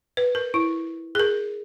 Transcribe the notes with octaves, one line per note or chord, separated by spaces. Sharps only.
B4
A#4
E4
G#4 A#4